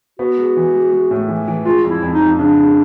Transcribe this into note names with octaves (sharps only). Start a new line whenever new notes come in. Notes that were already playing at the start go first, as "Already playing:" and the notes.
B3 F#4
G#3
E3
G#3
G#3
A2
E3
E3
G#3 F4
F2
E4
F2
D#4
F2
C#3 D4
G#3